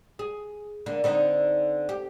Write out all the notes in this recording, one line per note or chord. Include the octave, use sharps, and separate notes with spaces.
G#4
D3 A#3
D3 C4 D#4
G4